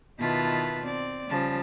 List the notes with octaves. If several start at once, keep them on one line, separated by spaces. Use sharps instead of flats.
B2 D#3 E4 F4 B4 A5
C4 D5
C#3 F3 G3 A5